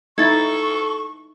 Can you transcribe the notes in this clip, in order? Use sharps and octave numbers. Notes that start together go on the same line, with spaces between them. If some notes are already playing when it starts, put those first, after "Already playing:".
D#4 E4 A4 C#6 G#6 A6